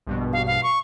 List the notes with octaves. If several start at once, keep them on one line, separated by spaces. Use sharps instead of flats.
A#1 G2 B2
F5
F5
C#6